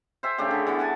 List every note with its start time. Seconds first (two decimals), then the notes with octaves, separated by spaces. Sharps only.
0.23 C5 E5 G#5
0.38 C#3 A3 D4 G4
0.51 D3 G#4
0.67 E3 G3 B3 C#6
0.79 F#5 G#5 A5